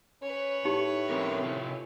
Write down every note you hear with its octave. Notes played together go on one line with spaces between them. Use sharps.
C#4 B4 C#5
A2 D#4 G4
C4 C#4 A#4
C3 F4